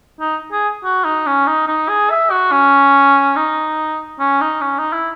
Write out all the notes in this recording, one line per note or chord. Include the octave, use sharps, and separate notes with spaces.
D#4
G#4
F#4
D#4
C#4
D#4
D#4
G#4
E5
F#4
C#4
D#4
C#4
D#4
C#4
D#4
E4